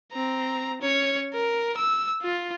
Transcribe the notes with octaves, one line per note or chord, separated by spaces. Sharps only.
C4 A#5
C#4 C#5
A#4
E6
F4